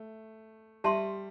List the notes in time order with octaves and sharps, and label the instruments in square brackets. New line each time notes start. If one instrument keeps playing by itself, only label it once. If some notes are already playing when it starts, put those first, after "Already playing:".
Already playing: [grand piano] A3
[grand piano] G3 [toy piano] G4 E5 A5 C6